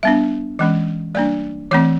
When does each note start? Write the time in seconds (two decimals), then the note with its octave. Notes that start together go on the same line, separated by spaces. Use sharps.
0.03 G3 B3 D4 E5
0.59 E3 G#3 C#4 D#5
1.15 G3 A#3 D4 D5
1.71 E3 A3 C4 C#5